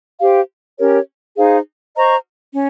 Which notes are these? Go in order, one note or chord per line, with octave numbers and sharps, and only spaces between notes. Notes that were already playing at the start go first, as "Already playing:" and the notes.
G4 C5 F5
C#4 G4 A#4 C#5
D#4 G#4 C5 F5
C5 D#5 A#5 C#6
C#4